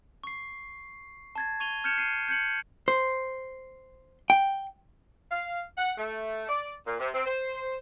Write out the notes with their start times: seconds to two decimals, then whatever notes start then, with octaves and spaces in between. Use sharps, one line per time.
0.24 C#6 C7
1.35 A5 G#6 A6
1.60 C#6 G#6 D#7 F7 G7
1.84 F6 G6 G#6 C#7 E7 F7
1.98 C7 D#7
2.29 G6 G#6 C#7 F#7
2.88 C5
4.30 G5
5.32 F5
5.78 F#5
5.98 A3
6.49 D5
6.87 A#2
7.00 C3
7.14 C4
7.26 C5